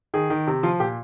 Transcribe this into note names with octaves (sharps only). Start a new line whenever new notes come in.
D#3 G#4
D#3
C3
F3 F4
A#2 G4